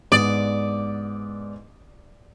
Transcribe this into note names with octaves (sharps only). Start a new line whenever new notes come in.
G#2 B3 D5 D#6